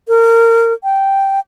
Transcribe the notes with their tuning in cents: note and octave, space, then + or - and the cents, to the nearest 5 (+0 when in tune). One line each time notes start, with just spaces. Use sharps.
A#4 -25
G5 -5